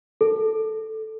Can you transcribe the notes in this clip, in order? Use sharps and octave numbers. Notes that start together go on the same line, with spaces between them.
A4